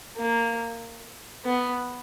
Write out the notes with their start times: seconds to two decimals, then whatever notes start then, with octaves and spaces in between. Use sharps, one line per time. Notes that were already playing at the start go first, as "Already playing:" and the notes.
0.17 A#3
1.45 B3